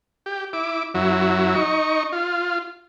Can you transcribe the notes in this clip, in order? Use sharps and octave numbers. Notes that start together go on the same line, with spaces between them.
G4
E4 D6
F#2 F#3 E4
D#4 C#6
F4